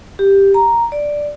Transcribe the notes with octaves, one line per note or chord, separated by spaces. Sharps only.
G4
A#5
D5